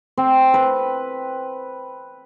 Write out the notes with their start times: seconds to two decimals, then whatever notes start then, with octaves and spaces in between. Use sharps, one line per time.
0.18 C4
0.54 B4